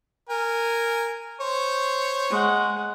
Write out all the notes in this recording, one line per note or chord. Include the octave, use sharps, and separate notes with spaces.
A#4 G#5
C5 C#5 C#6
G#3 F#5